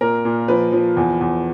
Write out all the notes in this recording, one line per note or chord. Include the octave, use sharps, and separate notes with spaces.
A#2 A#4
A#2
F3 B4
F3
E2
E2